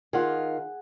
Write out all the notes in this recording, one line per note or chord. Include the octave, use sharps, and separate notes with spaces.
D#3 F4 G#4 F#5